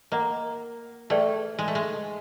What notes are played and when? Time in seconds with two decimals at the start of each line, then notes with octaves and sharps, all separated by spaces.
0.12 A#3 A#4 D#5 F#5 A#5
1.10 A3 G#4 B4 D5 G5
1.59 G#3
1.68 A3
1.75 G#3